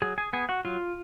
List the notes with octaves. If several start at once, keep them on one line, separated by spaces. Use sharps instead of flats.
F#3 G#4 G#5
G#4 G#5
B3 G#4 G#5
F#4 F#5
F#3 F4 F5